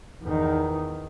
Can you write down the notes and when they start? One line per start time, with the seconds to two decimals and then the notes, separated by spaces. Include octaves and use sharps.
0.23 E2 D#3